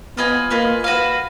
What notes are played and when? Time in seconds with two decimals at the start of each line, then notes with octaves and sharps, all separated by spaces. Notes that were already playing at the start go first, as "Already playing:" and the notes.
0.17 B3 F4 B4 D#5 G#5
0.50 A#3 F4 B4 D#5 G#5
0.84 F#4 B4 F5